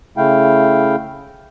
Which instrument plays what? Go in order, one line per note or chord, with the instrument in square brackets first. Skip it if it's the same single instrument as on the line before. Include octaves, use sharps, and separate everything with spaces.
[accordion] C#3 A3 E4 F5 G5